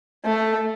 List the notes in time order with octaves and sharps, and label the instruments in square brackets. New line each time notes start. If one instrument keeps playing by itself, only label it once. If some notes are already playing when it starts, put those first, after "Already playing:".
[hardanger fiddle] A3